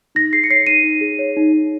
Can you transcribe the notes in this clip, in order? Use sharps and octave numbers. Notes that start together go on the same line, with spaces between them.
D#4 A#6
G#4 C7
C#7
C#5 C7
D#4 D#7
D#4
G#4
C#5
D#4
D#4